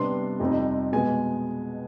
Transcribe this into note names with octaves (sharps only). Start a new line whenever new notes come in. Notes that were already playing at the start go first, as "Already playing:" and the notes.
Already playing: C3 G3 B3 D4 C6
F2 C3 G3 C4 D#4
B2 G#3 B3 G#5